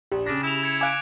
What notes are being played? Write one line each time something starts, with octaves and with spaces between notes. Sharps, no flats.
A#1 G4
C#3 D4 A#6
E4 E7 F7
G#6 C#7
F5 G#5 D6 F#6 D7